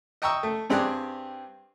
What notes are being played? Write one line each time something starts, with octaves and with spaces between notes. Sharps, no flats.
D#5 G5 A#5 C#6 D#6 E6
A3
G2 C4 G4 G#4 D5 F#6